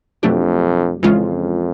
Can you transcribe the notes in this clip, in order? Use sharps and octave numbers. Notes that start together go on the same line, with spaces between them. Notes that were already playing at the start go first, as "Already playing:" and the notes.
F2 B2 F#3 A3 D4 G4
F2 C#3 E3 G#3 C#4 F4